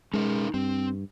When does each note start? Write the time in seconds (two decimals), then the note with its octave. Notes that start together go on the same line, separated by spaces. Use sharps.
0.14 G#3 C#4 D#4 A#4
0.54 G2 C4